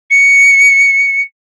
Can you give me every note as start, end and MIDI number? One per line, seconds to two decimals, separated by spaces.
0.10 1.22 97